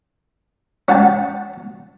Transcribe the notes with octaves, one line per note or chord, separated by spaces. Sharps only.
C#4 F#5 G5 A5